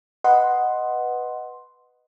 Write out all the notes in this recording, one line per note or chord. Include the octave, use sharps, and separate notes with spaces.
B4 D#5 F#5 C6